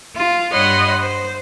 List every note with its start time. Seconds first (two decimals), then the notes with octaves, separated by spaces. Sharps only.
0.15 F4
0.52 G2 C#5 D#5 F#5 B5 C6
1.01 C5